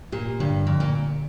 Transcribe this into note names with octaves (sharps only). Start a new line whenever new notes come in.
A#2 G4
G2 D3
F2 D3
A#2